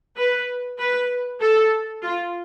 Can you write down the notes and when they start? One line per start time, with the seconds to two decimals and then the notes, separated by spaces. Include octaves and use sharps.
0.17 B4
0.79 B4
1.41 A4
2.03 F4